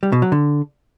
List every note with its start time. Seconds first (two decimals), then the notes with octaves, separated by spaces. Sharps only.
0.03 G3
0.12 B2
0.22 F#3
0.32 D3